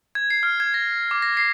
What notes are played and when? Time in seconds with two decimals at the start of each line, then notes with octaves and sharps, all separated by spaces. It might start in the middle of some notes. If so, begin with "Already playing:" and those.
0.15 G#6
0.30 C7
0.43 F6
0.60 G#6
0.74 A#6
1.11 D6
1.22 A#6
1.37 C7